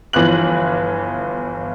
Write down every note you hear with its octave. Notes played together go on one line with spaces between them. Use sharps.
G1 E3 F3 B3 F#6 F#7